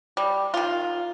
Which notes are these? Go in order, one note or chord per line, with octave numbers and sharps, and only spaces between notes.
G3
D#3 F4